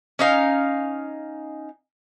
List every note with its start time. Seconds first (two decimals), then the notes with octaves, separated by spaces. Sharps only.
0.19 C#4 D#4 F5